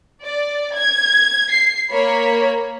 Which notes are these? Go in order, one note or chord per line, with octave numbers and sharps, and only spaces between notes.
D5
G#6
C7
A#3 C#5 B5